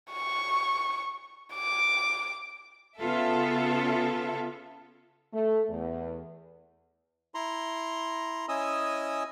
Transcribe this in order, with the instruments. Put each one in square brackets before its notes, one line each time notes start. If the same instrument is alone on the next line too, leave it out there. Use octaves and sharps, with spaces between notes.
[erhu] C#6
D6
[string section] C#3 B3 F4 A4 E5
[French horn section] A3
E2
[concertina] E4 A#5 C6
C#4 E4 D#5 G#5 D#6 E6